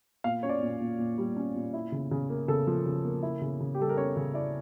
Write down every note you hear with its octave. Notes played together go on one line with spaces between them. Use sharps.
A#2 F5
C#4 C#5
D5
A#2
A#2
A#2
G3
C#4
A#2
E4
C#3
C#3
A#3
C#3 A4
F3
C#3
A#3
E4
C#3
C#3
G4
G3 A4
A#4
C#4 C#5
C#3
E4 D5